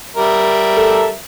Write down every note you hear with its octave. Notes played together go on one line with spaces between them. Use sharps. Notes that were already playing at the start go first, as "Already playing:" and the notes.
G3 A#4 E5
A4